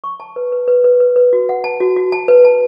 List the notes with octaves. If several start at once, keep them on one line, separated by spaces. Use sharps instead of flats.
C#6
A5
B4
B4
B4
B4
B4
B4
F#4
F#5
A5
F#4
F#4
A5
B4
A5